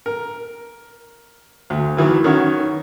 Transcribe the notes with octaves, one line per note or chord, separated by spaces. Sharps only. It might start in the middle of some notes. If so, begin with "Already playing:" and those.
A#4
D2
D#3 E3 F#3
D#3 C#4 F#4